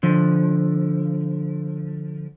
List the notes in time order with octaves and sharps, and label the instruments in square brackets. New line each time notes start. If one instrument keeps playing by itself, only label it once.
[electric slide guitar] D3 F3